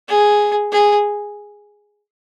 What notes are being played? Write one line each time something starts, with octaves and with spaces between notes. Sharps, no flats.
G#4
G#4